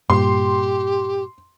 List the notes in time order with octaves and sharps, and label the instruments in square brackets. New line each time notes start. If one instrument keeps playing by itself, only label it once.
[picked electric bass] G2 A#2 [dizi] G4 [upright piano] C6